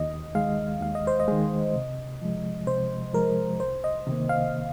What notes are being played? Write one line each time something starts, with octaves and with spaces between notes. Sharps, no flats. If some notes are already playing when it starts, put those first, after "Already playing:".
Already playing: D#2 D#5
D#3 G#3 F5
D#2 F5
D#5
C5
D#5
D#3 G#3
C3
F3 G#3
C3 C5
F3 G#3 A#4
C2 C5
D#5
C3 D#3 A#3
F5